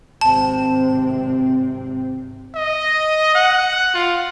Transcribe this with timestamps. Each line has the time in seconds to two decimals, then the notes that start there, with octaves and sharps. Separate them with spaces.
0.21 G#1 C3 C4 A5
2.55 D#5
3.35 F#5
3.94 F4